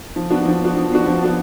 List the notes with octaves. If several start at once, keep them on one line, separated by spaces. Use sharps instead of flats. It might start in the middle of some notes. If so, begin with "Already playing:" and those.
F3
B3 D4 F#4
F3
B3 D4 F#4
F3
B3 D4 F#4
F3
B3 D4 F#4